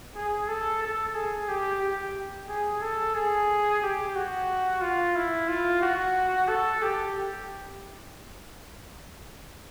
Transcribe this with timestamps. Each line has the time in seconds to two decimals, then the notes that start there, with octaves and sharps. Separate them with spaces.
0.16 G#4
0.48 A4
0.82 A4
1.15 G#4
1.48 G4
1.82 G4
2.49 G#4
2.81 A4
3.15 G#4
3.82 G4
4.15 F#4
4.81 F4
5.15 E4
5.48 F4
5.81 F#4
6.48 A4
6.82 G4